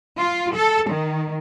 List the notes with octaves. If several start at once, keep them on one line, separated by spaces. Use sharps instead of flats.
F4
A4
D#3